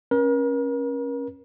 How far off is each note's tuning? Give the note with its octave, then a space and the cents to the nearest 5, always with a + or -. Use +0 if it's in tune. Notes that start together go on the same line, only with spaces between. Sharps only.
C#4 -15 A#4 +40